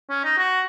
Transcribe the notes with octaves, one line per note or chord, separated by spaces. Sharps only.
C#4
D#4
F#4